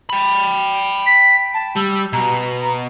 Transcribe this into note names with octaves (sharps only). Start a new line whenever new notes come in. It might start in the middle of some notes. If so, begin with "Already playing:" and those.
G5 B5
B6
A5
G3 E6
B2 A#5